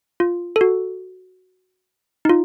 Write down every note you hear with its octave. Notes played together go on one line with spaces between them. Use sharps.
F4
A4
F#4
D#4
F4